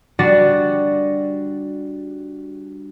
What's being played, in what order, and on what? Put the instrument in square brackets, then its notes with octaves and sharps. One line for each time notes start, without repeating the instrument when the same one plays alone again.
[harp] G3 D4 F#4 A6 A#6 D#7